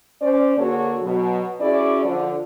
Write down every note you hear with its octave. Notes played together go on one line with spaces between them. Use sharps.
C#4 C5 D5
D3 A#3 F#4 G#4 A4 C#5
B2 F#3
C#4 E4 F#4 G#4 D5
D3 F3